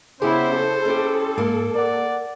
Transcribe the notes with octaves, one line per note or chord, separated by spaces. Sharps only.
C#3 B3 E4 G4 G#4 C5
E4 A4
C#4 E4 G4
G#2 A#3
A#4 D5 F#5